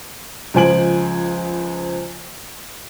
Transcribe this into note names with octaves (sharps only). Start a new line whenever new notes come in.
C#2 F3 C5 G#5 D7 F#7